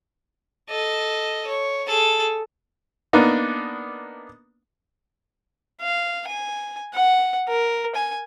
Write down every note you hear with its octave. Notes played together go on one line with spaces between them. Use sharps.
A4 D#5
C#5
G#4 A4
A#3 B3 D4 D#4
F5
G#5
F#5
A#4
G#5